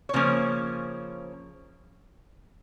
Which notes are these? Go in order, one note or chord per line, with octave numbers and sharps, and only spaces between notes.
C#5
C#3 F3 A#3 C#4 C5